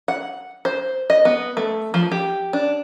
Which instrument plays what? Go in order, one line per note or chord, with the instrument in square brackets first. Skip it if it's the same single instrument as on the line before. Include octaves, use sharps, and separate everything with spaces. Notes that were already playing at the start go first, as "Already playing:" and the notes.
[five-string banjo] F#5
C5
D#5
B3
A3
F3
G4
D4